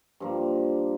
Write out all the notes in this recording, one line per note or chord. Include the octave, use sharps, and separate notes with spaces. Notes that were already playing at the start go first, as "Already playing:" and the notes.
G2 F3 A#3